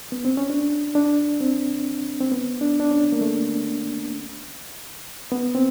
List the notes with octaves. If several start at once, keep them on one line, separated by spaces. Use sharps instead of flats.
B3
C4
C#4
D4
D4
C4
C4
B3
D4
D4
C#4
A#3
A3
B3
C4